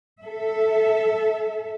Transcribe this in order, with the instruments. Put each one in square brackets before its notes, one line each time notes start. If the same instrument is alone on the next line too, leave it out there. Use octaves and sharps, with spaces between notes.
[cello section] A4 E5